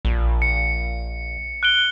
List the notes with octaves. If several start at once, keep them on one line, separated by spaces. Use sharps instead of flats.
A#1
C#7
F#6 D7 G7